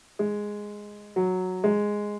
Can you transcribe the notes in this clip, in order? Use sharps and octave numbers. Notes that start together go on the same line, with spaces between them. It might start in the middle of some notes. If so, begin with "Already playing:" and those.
G#3
F#3
G#3